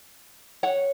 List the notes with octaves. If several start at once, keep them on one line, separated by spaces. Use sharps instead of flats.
C#5 F#5